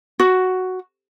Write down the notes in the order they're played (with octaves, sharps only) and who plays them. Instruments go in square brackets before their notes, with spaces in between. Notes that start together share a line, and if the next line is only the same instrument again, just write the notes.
[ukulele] F#4